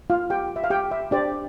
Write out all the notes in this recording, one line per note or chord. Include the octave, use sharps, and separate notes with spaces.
F4 F5
G4 G5
E5
F5
G4 G5
E5
D4 G4 C5 D5